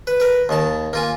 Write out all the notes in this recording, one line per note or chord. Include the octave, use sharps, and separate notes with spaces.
B4
A#4 B4
D#2 D#3 A5
A#3 F4 G#5